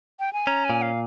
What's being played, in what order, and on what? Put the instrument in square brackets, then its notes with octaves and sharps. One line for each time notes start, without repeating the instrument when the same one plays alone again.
[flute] G5
G#5
[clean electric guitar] C#4 [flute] A#5
[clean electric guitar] A#2 [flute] G#5
[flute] F5